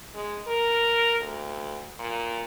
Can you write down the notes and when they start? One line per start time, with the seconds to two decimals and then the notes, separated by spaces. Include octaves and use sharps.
0.15 G#3
0.47 A#4
1.21 D2
1.99 A#2